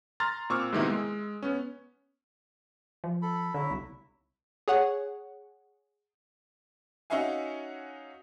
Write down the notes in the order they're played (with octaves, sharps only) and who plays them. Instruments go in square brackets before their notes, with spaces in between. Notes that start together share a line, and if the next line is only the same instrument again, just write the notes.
[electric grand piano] A#5 C6 F6 A6
A#2 C4 C#6 D6 E6 F6
G#2 C3 D#3 A#3 B3 E4
G#3
B3 C#4
[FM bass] F3
[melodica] A4 B5
[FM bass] D3 [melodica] F#3 E4 E5
[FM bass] C2
[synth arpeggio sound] G#4 C#5 F#5
[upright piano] C#4 D#4 F#4 E5 F5 G#5